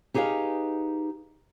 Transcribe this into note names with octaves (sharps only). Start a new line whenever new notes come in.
D#4 G4 G#4 B4 D#5 F5